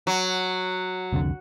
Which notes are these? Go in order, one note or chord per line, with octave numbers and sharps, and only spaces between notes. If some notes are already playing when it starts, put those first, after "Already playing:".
F#3
C2 F2 D3